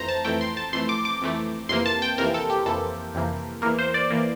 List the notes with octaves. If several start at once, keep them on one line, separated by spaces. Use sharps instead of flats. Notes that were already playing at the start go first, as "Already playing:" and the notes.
Already playing: F2 E3 A3 C5 A#5
A5
F2 E3 A3 G5
C6
A5
F2 E3 A3 C6
D6
D6
F2 E3 A3
F2 C3 E3 A#3 C6
A5
G5
F2 C3 E3 A#3 A#4
A4
G4
F2 C3 E3 A#3 A4
F2 C3 E3 A#3
E2 E3 A#3 A#4
C5
D5
E3 A#3